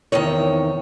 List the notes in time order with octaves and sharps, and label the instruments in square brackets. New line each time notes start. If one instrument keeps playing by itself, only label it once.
[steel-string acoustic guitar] E2 C3 D#3 C#5